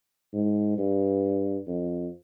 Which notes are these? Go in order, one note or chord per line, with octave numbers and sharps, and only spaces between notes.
G#2
G2
F2